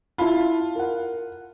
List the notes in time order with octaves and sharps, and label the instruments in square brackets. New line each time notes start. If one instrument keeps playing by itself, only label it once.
[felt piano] E4 A5 B5 [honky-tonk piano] F4
[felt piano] A#4 F#5